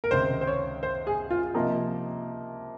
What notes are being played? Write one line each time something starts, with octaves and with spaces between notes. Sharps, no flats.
A#4
C#2 C3 D#3 C5
C5
C#5
C5
G#4
F4
C3 F3 A#3 D#4 F4